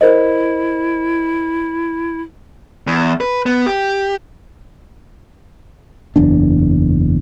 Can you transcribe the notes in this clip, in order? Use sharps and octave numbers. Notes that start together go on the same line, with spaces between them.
E4 A#4 C5 D#5
E2
B4
B3
G4
F#1 E2 D4